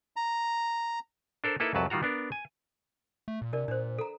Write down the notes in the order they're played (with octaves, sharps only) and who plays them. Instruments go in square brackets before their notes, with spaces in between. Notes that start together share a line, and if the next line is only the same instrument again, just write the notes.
[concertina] A#5
[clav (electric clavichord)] D4 A4 A#4 C5
A#3 D#4 E4 A4 B4
C2 F2 F#3 B4 A5
D#3 G3 F4 F#4 A#5
B3 D4 A#4
G#5
[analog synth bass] A3
A#2
[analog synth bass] C3 [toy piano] D4 A#4 D5
[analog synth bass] A#2 [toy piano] D4 C5
[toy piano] A4 A#5